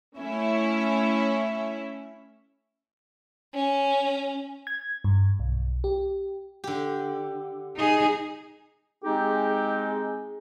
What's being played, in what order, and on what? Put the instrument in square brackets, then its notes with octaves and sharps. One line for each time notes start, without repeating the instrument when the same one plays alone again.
[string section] A3 C#4 E4 E5
[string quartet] C#4
[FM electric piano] G#6
G2
B1
G4
[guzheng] D3 G4
[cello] D#4 G#4
[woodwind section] G#3 C4 D#4 [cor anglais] G4 [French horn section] G#4